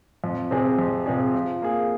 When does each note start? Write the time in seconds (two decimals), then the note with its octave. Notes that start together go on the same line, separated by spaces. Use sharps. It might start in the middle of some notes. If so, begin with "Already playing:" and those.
0.24 F2
0.51 C3 F3 C4 G#4
0.78 F2
1.06 C3 F3 C4 G#4
1.34 F3
1.62 A#3 G#4